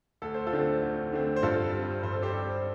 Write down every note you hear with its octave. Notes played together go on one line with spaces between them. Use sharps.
D2 A4
C5
F4 A4
D3 A3 C4
D2
D3 A3 C4
C5
G2 F4 A4
G3 C4
G2 C5
A4
G4 C5
G3 C4